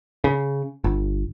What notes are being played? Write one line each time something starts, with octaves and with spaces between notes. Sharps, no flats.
C#3
G1